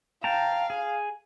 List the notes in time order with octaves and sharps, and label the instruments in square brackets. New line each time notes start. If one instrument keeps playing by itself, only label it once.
[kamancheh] F5 [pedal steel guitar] G5 A5 A#5
[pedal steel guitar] G#4